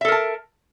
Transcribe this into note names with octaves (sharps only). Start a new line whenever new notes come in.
A4 A#4 E5 A5